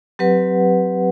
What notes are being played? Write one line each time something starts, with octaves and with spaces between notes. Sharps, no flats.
F#3 C4 G4 B4 F#5